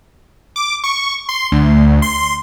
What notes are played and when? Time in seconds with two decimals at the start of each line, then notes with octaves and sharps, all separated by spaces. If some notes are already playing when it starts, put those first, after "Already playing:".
0.56 D6
0.84 C#6
1.29 C6
1.52 D2
2.02 C6